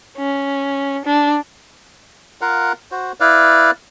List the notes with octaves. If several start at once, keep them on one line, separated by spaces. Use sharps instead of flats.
C#4
D4
F4 A#4 F5 F#5
F#4 C5
E4 B4 D5 F5